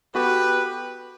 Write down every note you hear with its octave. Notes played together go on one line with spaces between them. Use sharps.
B3 F#4 G4 A4 B4